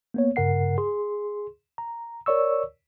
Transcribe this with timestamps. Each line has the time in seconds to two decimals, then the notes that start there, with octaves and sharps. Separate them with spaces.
0.14 A#3 B3 C#5
0.36 G2 C#3 A#4 F#5 C7
0.78 G#4 C6
1.78 A#5
2.26 A#4 C#5 D5 C#6 E6